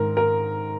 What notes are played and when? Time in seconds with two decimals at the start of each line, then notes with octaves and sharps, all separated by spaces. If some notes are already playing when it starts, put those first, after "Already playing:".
Already playing: G#2 D#3 A#4
0.17 A#4